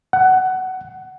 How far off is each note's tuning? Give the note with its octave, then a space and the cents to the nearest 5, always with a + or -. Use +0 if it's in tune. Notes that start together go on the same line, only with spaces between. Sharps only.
F#5 +15